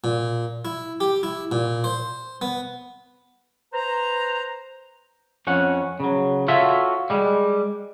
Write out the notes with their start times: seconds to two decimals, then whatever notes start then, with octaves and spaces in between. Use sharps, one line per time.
0.04 A#2
0.65 E4
1.00 G4
1.23 E4
1.52 A#2
1.84 C5
2.42 B3
3.73 B4 C5 A#5
5.47 F2 C#4 F#5
6.00 C#3 F#3
6.48 F4 F#4 A4 C#5 E5
7.10 G3 G#3